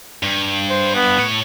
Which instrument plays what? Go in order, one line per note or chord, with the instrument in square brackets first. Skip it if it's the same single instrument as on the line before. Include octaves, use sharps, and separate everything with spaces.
[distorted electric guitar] G2
[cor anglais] C5
B3
[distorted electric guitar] A2 C#5